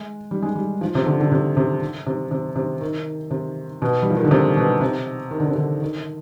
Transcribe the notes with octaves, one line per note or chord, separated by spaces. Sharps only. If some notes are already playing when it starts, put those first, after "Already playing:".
Already playing: G#3
G3
G#3
G3
F3
C3
D3
D3
C3
C3
C3
C3
C3
D#3
C3
B2
G3
F3
D#3
D3
C3
B2
C3
D#3
D3
C3
D3
D#3